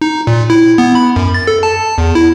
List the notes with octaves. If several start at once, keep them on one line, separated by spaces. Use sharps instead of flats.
D#4
A#2
E4
B3
B5
F#2
A6
A4
A5
E2
E4